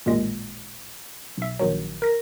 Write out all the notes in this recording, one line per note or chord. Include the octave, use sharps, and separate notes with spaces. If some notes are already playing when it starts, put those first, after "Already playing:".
A1 D#2 A#2 G#3 A#6
B1 E5
A#1 D#3 F#3
A#4 A#6